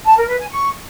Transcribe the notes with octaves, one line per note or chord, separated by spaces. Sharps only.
A5
A#4
B4
G#5
C#6